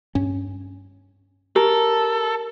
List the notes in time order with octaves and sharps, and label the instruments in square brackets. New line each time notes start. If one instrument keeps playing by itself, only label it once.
[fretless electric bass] G2 C#4
[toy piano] G4 [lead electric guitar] A4 [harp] A#4